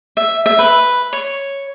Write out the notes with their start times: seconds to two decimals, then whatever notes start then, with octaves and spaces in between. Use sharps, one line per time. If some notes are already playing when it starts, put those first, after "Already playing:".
0.17 E5
0.46 E5
0.59 B4
1.13 C#5